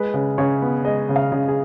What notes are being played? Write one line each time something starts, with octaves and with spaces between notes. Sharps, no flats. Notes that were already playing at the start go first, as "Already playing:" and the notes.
Already playing: G#3 B4
C#3
C#3 C#5
B3
G#3 D#5
C#3
F5
C#3
G#4